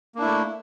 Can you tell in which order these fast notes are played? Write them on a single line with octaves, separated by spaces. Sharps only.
A#3 D4 E4 A3